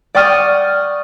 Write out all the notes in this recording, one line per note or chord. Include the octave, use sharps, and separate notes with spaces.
D5 F#5 G5 C#6 D#6 F6